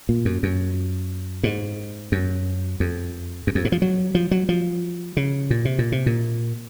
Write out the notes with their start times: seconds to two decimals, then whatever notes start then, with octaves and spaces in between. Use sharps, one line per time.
0.09 A#2
0.25 F#2
0.43 F#2
1.43 G#2
2.12 F#2
2.80 F2
3.47 F#2
3.55 F2
3.65 G#2
3.72 F3
3.82 F#3
4.15 F3
4.31 F#3
4.49 F3
5.17 C#3
5.50 A#2
5.65 C3
5.79 A#2
5.92 C3
6.06 A#2